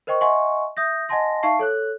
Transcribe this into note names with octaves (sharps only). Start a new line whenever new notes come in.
A#4 C5 D#5 G5 C#6
D#5 E5 F#5 G#5 C6 C#6
E5 D#6 G6 A#6
D#5 F#5 G#5 A5 C6 A#6
D#4 E5 F5 A5 C#6 C7
A4 C#5 F#6